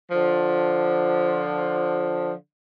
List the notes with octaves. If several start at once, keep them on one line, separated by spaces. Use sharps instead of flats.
D3 F3